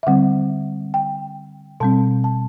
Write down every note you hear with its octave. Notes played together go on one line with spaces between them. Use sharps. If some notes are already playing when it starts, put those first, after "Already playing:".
E5
D3 G3 C4 F#5
G5
B2 G3 C4 A5
A5